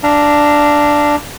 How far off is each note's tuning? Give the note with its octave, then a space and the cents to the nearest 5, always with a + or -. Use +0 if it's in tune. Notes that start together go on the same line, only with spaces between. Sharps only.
D4 +0 F5 -30 A#5 +0